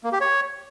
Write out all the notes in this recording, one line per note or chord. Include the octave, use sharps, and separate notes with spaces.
A#3
G4
C#5